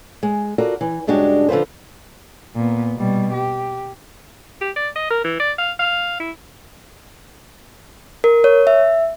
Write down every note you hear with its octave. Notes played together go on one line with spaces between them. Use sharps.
G#3
F4 F#4 A4 A#4 D5
E3
G2 C#3 G#3 D4 F#4 G4
D3 F3 F4 B4 C5
A#2 B3
B2 G3
G4
G4
D5
D#5
A#4
E3
D5
F5
F5
E4
A#4
C#5
E5